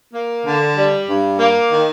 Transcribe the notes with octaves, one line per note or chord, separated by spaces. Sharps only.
A#3
D3
G3
G2
A#3
D#3